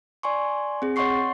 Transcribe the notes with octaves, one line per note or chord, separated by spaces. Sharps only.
D5 G#5 C6 C#6
C4 G#4
C#5 D#5 F#5 C6 C#6 C7